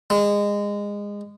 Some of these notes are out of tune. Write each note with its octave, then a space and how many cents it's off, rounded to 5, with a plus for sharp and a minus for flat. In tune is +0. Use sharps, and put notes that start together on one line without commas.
G#3 -25